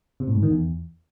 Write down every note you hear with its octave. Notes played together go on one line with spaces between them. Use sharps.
C3
A2
G#2
D#3
E2